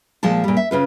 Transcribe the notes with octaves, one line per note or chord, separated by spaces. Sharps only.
A#2 F3 G#3 A5
A#2 G3
E5
C#3 F4 B4